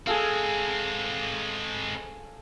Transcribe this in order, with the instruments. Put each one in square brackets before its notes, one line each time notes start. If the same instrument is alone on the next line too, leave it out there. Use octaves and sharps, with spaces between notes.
[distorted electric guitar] G#3 C4 [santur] G#4 A4 F5